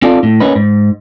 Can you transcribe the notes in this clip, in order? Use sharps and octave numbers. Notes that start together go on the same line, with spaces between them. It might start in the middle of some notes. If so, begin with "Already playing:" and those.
C4 D#4 F4 A4 D5
A2
A#3 C#4 D#4 B4
G#2